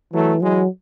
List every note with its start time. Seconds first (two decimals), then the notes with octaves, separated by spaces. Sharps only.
0.13 E3 F#3 A3
0.41 E3 F#3 G#3